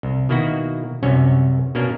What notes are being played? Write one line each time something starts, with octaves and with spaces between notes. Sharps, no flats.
C2
B2 D#3 A#3 E4 F#4
C2 F#2 C3 C#4 C#5
B2 A#3 C#4 D4 A#4